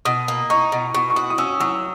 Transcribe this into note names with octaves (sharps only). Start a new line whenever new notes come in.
B2 D#6
A#3
D#4 C#6
B2
B2 C#6
C#6
F#4 D#6
D#6
C#4 E6
F#3 E6